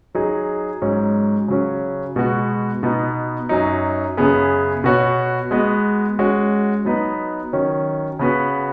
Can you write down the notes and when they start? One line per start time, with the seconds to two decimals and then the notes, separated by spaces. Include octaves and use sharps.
0.15 F#3 D#4 G#4
0.82 G#2 F#3 C#4
1.48 C#3 F#3 C#4
2.16 B2 G#3 B3 F#4
2.83 B2 B3 D#4
3.49 F#2 F#3 D#4
4.17 F#2 C#3 B3 G#4
4.84 B2 B3 F#4 C#5
5.51 G#3 B3 F#4 D#5
6.19 G#3 C#4 F#4
6.85 F#3 B3 D#4 B4
7.53 D#3 F#3 C#4
8.19 C#3 B3 F#4 B4